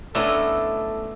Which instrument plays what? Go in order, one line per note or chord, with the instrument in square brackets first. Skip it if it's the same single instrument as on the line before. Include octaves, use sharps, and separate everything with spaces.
[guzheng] A3 D#5 A#5 [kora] B3 C#4 E4 [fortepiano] D4 [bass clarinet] A4